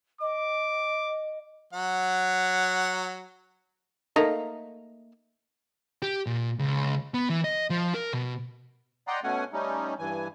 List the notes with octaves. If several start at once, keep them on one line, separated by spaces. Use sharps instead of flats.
D#5 D6
F#3 F#5
A3 A#3 D#4
G4
A#2
C#2
B3
E3
D#5
F3
A#4
B2
D5 D#5 F#5 G5 A#5 C6
B2 A3 C#4 F#5 G#5
G3 A3 C#4 D#4
G2 E3 G#5